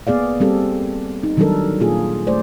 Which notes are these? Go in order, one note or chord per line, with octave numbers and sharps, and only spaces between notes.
A#3 B3 G#4 D5 F5
G3 A#3 C4 G4 A4
D#4
D#3 F#3 G3 D4 A4 A#4
A#2 A#3 F4 G#4
A3 C5 D5